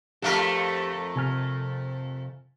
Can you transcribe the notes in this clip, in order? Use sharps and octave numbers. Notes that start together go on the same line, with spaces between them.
F2 A3 G4 A4 A#4
C3 G#5 F6